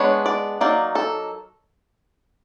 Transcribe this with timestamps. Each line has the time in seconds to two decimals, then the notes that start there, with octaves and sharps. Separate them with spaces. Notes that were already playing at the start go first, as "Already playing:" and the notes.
Already playing: G#3 B3 D4 C#5
0.26 D5
0.61 F#3 A#3 D#4 D5
0.95 A4